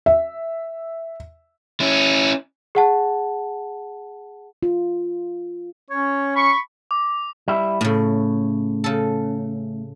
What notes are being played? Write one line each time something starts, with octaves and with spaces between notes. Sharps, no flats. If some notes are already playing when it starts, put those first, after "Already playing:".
E5
C#4 E4
G#4 F#5 A5
F4
C#4 C#5
B5 C#6
D6
G3 E4 E5
A2 C#3 A3
C#3 A4